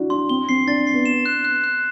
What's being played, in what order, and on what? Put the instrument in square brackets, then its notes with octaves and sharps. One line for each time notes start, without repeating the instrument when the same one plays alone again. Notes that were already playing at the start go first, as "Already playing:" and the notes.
Already playing: [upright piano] D4 E4 F#4
[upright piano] D4 [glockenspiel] C6
[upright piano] C4 [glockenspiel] G7
[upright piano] C4 [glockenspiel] C7
[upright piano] D4 [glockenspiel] A6
[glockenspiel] C7
[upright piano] B3
[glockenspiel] E7
F#6
F#6
F#6